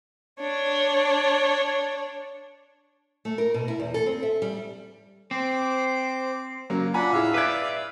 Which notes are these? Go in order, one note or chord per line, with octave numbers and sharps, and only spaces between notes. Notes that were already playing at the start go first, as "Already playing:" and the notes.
D4 C#5
A3
A#4
B2
E4
E2
A4
C4
E5
G3
C4 C5 D6
C#3 F#3 A#3
D4 F4 F#5 G#5 A#5 B5
A2 E4 G#4 E5 F5
B4 D5 D6 F#6 G#6